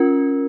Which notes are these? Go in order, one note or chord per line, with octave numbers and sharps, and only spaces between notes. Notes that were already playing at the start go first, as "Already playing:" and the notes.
Already playing: C#4 F4 A#4